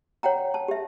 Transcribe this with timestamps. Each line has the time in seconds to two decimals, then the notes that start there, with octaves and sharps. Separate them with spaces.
0.23 C#5 F#5 G5 A#5
0.54 A5
0.68 G4 E5